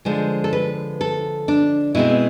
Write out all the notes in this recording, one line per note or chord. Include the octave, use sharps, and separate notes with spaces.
D3 F3 G#3 C5
A4
B4
A4
D4
B2 G#3 C4 E4